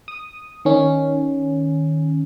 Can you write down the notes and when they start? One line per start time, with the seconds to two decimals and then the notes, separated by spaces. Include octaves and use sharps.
0.08 D#6
0.65 D#3 C#4